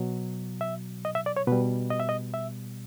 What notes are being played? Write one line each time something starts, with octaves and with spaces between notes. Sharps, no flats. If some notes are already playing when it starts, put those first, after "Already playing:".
Already playing: B2 F#3
E5
D#5
E5
D5
C#5
B2 G3 B4
D#5
E5
D#5
E5